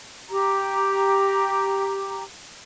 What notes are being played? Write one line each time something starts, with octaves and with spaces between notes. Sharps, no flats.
G4 A#5